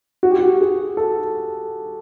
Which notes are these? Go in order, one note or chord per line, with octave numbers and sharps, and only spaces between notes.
F#4
G4
F#4
G#4
A4